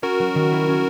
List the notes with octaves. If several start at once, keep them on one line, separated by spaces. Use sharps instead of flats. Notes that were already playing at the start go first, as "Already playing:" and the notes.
C#4 F#4 A#4
F#3
D#3
E4
C#4